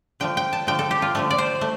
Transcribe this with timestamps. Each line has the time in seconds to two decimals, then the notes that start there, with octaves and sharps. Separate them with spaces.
0.20 D3 F3 A3 G5
0.37 G5
0.53 A5
0.67 D3 F3 A3 G5
0.79 A4
0.91 G4
1.02 F4
1.15 D3 F3 A3 A4
1.31 D5
1.38 C5
1.61 A3